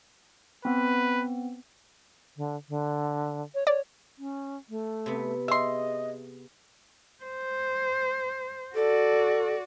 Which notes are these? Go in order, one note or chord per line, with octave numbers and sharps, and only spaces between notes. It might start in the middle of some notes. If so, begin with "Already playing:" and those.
B3 C4 B4
D3
D3
C#5
C#5 D5
C#4
A3
C3 B3
G#4 D#5 E5 C6
C5
F#4 A4 D5